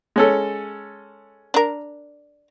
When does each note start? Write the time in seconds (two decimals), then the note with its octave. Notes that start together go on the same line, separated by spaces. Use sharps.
0.16 G#3 C#4 A4
1.54 D4 A#4